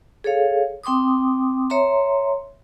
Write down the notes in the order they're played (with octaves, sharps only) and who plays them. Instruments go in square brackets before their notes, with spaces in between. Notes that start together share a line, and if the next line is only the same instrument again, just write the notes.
[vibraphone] G#4 A4 C#5 F5
C4 G5 C6 D6 D#6
C#5 E5 A#5 C6